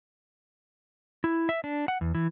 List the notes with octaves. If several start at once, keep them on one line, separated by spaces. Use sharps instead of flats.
E4
E5
D4
F#5
E2
E3